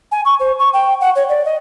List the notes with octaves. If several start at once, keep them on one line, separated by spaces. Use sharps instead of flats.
G#5
C#6
C5
C#6
G5
F#5
C#5
D5
D#5